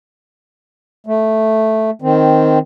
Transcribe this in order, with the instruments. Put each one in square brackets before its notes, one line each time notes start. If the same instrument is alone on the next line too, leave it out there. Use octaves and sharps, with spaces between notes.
[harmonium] A3
D#3 C4